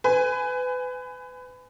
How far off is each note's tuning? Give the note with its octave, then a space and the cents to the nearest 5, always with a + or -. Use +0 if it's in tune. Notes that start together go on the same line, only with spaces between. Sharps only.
B4 +30 G#5 +0